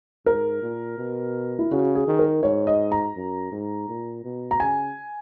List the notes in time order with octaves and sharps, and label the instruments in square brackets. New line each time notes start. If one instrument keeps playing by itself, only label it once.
[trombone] G#2 [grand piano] A#4
[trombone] A#2
B2
[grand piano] E4
[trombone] C#3 [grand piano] F#4
[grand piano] G#4
[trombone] D#3
[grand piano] A#4
[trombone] G#2 [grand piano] C#5
[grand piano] D#5
A#5
[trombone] F#2
G#2
A#2
B2
[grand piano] A#5
[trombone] C#3 [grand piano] G#5